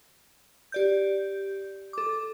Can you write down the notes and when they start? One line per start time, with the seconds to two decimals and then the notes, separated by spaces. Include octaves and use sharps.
0.72 G4 D5 G6
1.93 A4 D6